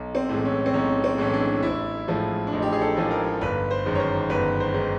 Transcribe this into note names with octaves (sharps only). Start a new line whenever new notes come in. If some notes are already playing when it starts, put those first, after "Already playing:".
Already playing: B1
C4
A2 E3 G#3
C#4
C4
B1 C#4
C4
A2 E3 G#3 C#4
D4
A1 E4
A2 F3 G#3
D4
A1 D#4
G4
G#4
A4
A2 F3 G#3
A#4
G1 B4
C5
F#2 D#3 G#3
C#5
C5
G1 B4
C5
D#3 G#3